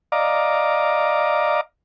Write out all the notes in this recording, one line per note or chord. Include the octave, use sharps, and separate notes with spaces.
D5 D#5 F5 A#5 D6